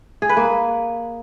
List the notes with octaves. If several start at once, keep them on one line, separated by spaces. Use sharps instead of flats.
G#4
B4
A#3